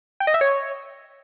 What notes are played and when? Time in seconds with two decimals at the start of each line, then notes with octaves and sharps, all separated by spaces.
0.20 G5
0.27 D#5
0.34 E5
0.41 C#5